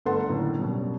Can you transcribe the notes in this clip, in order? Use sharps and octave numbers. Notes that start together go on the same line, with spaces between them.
G1 G2 A3 A4 F#5 C6
F#1 A2 D3
F#2 B2 G3